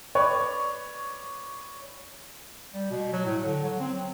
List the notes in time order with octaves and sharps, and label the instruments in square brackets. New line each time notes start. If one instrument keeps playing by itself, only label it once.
[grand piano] B4 C#5 D5 C#6
[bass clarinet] G3
B2
F#3
A2
D3
F#3
C4
F#3